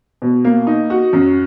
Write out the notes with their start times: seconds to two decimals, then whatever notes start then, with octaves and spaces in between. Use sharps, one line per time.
0.22 B2
0.45 A#3
0.67 D#4
0.90 F#4
1.13 F#2